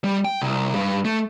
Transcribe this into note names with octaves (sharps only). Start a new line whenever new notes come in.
G3
G5
C2
G2
A3